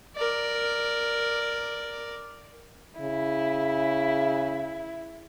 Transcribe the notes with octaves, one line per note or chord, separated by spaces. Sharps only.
A#4 D5
C#3 E4